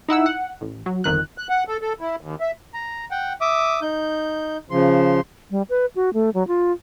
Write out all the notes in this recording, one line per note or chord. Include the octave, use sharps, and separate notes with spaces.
D#4 E4 F#5 E6
F#5
A1
F#3
G1 F2 D#3 F#6
F#6
F#5
A4
A4
E4
D#2
E5
A#5
F#5 G5
E5 D6 D#6
D#4 G6
C#3 F3 C6
G3
B4
F#4
A3
F#3
F4